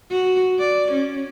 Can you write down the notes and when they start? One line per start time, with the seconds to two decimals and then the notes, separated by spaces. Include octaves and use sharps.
0.10 F#4
0.59 D5
0.91 C#4